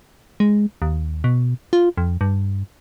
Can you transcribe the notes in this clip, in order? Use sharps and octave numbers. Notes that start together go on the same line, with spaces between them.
G#3
D#2
B2
F4
F2
G2